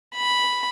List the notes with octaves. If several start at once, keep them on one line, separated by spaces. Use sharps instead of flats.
B5